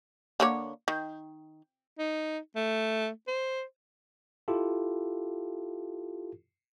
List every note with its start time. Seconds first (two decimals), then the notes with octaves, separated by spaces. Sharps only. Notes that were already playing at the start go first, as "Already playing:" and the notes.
0.40 D3 A#3 C#5
0.88 D#3
1.99 D#4
2.56 A3
3.28 C5
4.48 E4 F4 G4 A4